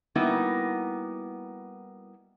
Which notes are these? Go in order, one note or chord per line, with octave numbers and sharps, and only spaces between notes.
G3 A#3 B3 D#4 E4 F#4